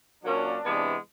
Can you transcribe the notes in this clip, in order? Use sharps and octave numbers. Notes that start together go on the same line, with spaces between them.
A#2 F#3 A#3 C#4 D4
C3 E3 G#3 B3